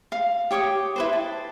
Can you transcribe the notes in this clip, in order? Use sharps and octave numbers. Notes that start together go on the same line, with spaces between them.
F5
G4 C#5 D6 D#6
E4 B4 C5
A5